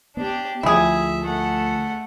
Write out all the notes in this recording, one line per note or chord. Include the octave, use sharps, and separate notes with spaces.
B3 D4 G4
D2 F3 E4 G#4 E5
A3 F#5